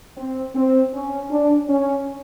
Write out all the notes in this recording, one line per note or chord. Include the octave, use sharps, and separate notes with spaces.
C4
C4
C#4
D4
C#4